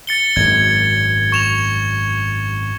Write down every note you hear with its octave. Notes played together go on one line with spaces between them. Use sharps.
A6 C#7 G7
G#1 F#2 G#6
C#6 E7 F7